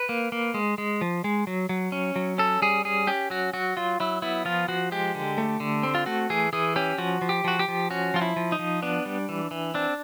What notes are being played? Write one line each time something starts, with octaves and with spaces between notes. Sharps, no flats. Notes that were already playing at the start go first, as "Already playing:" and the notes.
Already playing: B4
A#3
A#3
G#3
G#3
F3
G#3
F#3
F#3
C#4
F#3
C#4 A4
G3 G#4
C#4 G#4
C#4 G4
F#3 F#4
F#3 F#4
F#3 F4
F#3 E4
B3 E4
F3 F4
F3 F#4
G#3 G4
D3
A3
D3
C4
F4
A3 F#4
E3 G#4
E3 G#4
C#4 G4
F3 F#4
F3
G4
F3 F#4
G4
F3
C#4 F#4
F3 F4
E4
F3
D#4
F3
B3 D4
G3
E3
E3
C4 D4